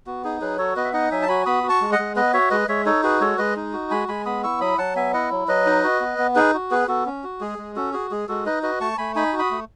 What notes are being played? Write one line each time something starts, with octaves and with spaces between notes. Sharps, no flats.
B3 F#4
D#4 G#4
F#3 G#4 B4
F#4 A4 C#5
B3 B4 D#5
E5
D#4 D#5 F#5
F#3 E5 G#5
A5
F#4 G#5 B5
B3 B5 D#6
F#4
A5 C#6
G#3
D#5 F#5
G#3
B3 B4 D#5
F#4 C#5 E5
G#3 B4 D#5
G#3 C#5 E5
D#4 A4 C#5
F#4 G#4 B4
G#3 A4 C#5
G#3 B4 D#5
D#4
F#4
G#3 G#5 B5
G#3 G#5 B5
B3 B5 D#6
E4 C#6 E6
F#3 B5 D#6
F#3 F#5 A5
B3 E5 G#5
E4 D#5 F#5
F#3
F#3 B4 D#5
D#4
F#4
B3
B3
D#4 G#4 B4
F#4
B3 G#4 B4
B3 F#4 A4
C#4
F#4
G#3 G#4
G#3
C#4 F#4 A4
F#4 G#4
G#3 G#4
G#3 F#4 A4
D#4 B4 D#5
F#4 B4 D#5
A3 A5 C#6
A3 G#5 B5
D#4 G#5 B5
F#4
B5 D#6
A3